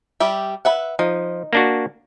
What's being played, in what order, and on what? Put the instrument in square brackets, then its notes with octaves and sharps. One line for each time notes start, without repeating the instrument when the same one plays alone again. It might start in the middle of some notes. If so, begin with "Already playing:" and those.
[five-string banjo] G3 G4 E5
B4 E5 F#5
[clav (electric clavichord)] F3 [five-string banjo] D#4
[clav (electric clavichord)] A#3 D4 F#4